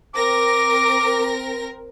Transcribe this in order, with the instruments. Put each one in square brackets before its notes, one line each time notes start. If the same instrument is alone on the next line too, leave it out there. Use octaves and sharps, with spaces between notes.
[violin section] C4 A#4 A#6 [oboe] D6